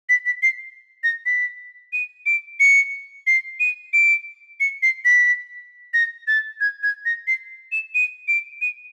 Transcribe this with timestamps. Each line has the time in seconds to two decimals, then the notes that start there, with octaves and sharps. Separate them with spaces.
0.09 B6
0.26 B6
0.43 C7
1.04 A#6
1.26 B6
1.93 D#7
2.26 D7
2.60 C#7
3.27 C7
3.60 D#7
3.93 D7
4.60 C#7
4.83 C7
5.05 B6
5.94 A#6
6.27 A6
6.61 G#6
6.83 G#6
7.05 A#6
7.27 C7
7.72 E7
7.95 D#7
8.28 D7
8.61 D#7